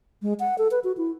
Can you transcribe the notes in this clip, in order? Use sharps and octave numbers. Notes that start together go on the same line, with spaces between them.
G#3
F#5
A4
B4
F#4
E4